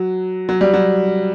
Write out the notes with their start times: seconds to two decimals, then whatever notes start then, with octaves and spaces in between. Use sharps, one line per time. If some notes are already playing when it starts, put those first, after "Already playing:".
Already playing: F#3
0.49 F#3
0.61 G3
0.74 F#3